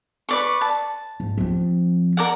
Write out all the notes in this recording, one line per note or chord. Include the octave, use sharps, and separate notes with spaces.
B4 D5 C#6
A5
G#2
F3 C4
A#4 D5 F#5